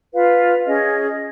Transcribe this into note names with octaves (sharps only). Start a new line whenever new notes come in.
F4 B4 F5
C#4 G#4 D#5